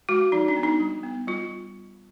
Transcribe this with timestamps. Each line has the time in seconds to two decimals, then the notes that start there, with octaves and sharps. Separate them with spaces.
0.09 G#3 F#4
0.32 F3 D#4
0.48 D4
0.57 B3
0.64 D#4
0.80 G3
1.03 B3
1.27 G3 F4